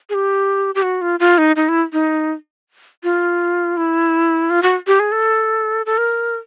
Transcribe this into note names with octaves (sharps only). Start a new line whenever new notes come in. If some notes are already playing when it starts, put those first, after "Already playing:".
G#4
G4
G4
F#4
F4
F4
D#4
D#4
E4
D#4
F4
E4
F4
F#4
G4
G#4
A4
A4
A#4